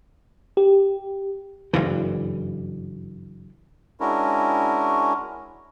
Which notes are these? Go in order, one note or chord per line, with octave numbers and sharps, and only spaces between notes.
G4
F#1 G2 E3
G#3 C#4 D4 E4 F#4 A#4